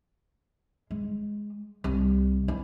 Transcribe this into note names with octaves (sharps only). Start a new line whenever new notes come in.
G#3
C2
E4